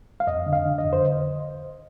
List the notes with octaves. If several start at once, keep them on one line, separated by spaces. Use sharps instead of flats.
F5
F2 D#5
D3
F5
D3
D#5
F2
C5